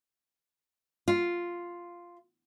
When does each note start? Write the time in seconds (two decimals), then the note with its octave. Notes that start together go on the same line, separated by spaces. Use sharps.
1.08 F4